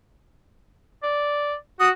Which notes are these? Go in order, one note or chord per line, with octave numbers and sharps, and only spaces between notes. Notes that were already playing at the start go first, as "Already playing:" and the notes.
D5
F#4 D#6